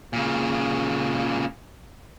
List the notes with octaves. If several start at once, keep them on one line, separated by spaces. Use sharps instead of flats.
A#2 C#3